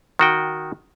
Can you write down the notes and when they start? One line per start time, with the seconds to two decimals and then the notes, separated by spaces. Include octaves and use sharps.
0.19 D#3 F#4 G5